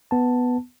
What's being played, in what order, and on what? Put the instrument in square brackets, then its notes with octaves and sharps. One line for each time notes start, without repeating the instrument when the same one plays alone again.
[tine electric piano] B3 A5